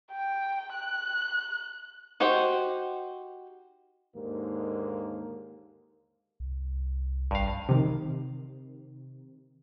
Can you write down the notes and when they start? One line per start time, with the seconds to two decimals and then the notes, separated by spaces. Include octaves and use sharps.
0.12 G5
0.75 F#6
2.20 D#4 F#4 G4 C5 G5
4.16 D#2 G#2 D3 A#3
6.40 C2
7.31 A1 G2 F5
7.69 C3 D#3